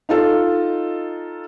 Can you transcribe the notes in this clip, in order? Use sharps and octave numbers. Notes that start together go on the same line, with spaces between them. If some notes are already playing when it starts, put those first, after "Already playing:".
D#4 F4 A4